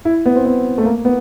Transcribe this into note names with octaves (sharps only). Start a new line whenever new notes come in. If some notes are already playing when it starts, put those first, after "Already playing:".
E4
B3
C4
B3
A3
A#3
B3